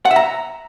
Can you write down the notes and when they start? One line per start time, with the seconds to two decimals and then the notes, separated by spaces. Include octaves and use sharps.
0.05 F#5
0.11 E5
0.16 A#5